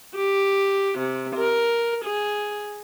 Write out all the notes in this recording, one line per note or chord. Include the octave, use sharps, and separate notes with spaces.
G4
C3
A#4
G#4